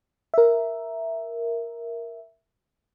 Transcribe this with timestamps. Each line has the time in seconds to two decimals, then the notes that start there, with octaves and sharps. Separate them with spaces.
0.34 A#4 E5